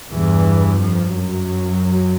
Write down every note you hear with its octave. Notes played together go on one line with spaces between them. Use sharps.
E2 G2 E3
F2 F3
F#2 F#3